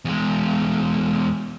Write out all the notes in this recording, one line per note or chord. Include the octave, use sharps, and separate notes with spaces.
E2 G#3